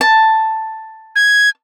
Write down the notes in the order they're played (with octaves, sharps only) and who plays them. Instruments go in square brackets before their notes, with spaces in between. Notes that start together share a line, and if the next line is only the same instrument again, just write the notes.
[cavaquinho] A5
[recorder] G#6